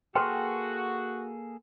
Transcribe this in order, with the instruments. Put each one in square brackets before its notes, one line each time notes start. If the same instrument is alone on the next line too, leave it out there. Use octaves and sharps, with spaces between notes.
[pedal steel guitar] A#3 G#4 A4 [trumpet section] F#4 [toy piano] B4 G5 C6